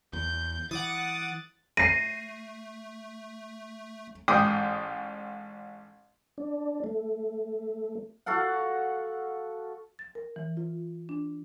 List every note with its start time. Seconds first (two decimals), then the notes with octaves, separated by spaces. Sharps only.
0.13 E2 G6
0.71 E3 F#5 D6 D#6 A6
1.77 A3 A#6 C7 D#7
4.28 A1 G#2 G5 D6 D#6
6.38 D4
6.84 A3
8.26 F#4 A4 F5 F#5
9.99 A6
10.15 A#4
10.36 E3
10.57 F4
11.09 D4